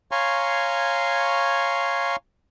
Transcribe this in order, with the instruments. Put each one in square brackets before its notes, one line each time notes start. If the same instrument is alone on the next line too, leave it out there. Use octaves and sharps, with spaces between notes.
[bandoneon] C#5 F5 G#5 A#5 C6 C#6